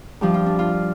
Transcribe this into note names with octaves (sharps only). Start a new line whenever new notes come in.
G2 F3 G4
F4
D4
F4